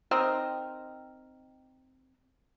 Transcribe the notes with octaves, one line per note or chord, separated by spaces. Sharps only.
C4 D#4 A#4